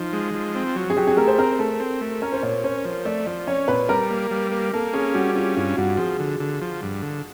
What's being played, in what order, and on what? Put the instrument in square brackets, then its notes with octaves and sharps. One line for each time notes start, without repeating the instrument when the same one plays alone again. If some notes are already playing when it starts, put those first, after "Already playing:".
Already playing: [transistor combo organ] F3 [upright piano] D#4
[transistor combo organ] G#3
F3
C4
F#3
[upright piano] G#4
[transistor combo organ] F#3 [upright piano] G4
[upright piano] G#4
[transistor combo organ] A3 [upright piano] A#4
[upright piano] C5
[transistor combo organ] C4 [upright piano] A#4
[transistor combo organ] A3 [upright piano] A4
[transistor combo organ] C4
A3
[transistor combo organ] C#4 [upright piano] A#4
[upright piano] C5
[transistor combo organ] A#2 [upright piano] C#5
[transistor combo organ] C#4 [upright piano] C5
[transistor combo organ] F3
[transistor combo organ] A3 [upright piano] D5
[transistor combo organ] F3 [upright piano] D5
[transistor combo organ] C#4 [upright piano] C#5
[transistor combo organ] A#2 [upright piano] B4
[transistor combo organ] G3 [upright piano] A#4
[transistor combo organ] A#3
G3
A#3
[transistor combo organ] A#3 [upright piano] A4
[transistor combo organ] C#4 [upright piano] G#4
[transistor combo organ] G3 [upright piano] F#4
[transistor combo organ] C#4 [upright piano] F4
[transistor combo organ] G2 [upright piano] F4
[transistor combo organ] G2 [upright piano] F#4
[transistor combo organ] F3 [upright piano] G#4
[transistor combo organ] D3
D3
F3
G2
D3